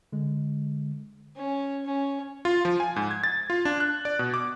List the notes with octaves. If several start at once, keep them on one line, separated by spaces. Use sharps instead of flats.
D3 G#3
C#4
C#4
F4
F3
G#5
G#2
G#6
A6
F4
D4
F#6
D5
B2
D6